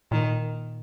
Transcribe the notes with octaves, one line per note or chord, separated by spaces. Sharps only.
A#2 D#3